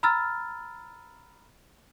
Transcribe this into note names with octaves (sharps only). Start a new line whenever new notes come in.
A#5 B5 E6 F6 A6